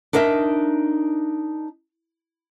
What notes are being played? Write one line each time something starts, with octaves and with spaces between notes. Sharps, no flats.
D4 D#4 A#4 D#5 E5